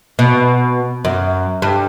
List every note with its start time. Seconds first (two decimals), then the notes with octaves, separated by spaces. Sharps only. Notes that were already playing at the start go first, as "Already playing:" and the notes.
0.19 B2
1.05 F#2
1.62 G2